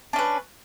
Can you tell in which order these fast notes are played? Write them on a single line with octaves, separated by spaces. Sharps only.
D4 C#4 B4